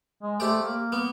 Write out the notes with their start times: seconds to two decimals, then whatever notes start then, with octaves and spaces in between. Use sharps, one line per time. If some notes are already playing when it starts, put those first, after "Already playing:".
0.23 G#3
0.40 A3 G4 C5 D5
0.62 A#3
0.92 B3